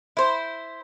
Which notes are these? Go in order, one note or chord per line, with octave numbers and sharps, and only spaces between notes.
E4 C5